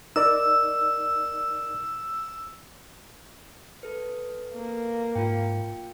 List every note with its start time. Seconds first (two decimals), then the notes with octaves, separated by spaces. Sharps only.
0.16 D#4 A#4 D5 E6
3.83 A4 B4
4.54 A#3
5.15 G#2 F4 G5